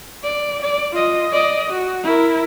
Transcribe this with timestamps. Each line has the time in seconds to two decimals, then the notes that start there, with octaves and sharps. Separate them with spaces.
0.24 D5
0.62 D5
0.92 F4 D#5
1.33 D5 D#5
1.71 F#4
2.04 E4 A#4